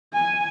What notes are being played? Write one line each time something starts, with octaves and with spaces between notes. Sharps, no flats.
G#5